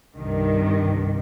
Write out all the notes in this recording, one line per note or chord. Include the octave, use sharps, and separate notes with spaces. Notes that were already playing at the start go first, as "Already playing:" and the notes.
C2 G2 D#3